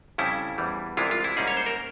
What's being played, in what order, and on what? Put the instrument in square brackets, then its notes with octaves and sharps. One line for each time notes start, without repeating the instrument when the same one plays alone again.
[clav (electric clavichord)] F2 C#3 G3 C#4 E4
E2 E3 G3
C2 C3 E3 G#3 E4 F4
F4
E4
G#2 G3 A#3 C#4 G#4
C#5
C5
A#4